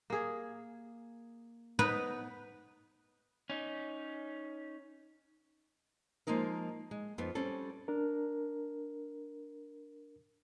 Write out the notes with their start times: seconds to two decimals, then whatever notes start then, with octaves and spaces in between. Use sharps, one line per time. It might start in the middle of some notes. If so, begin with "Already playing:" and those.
0.10 A#3 G#4
1.79 B3 D#4 B4
3.50 C#4 D#4
6.27 F3 G#3 A#3 D#4 A#4
6.91 G#3
7.18 F2 B3 D#4
7.35 G3 C4 C#4 A4
7.88 D4 A#4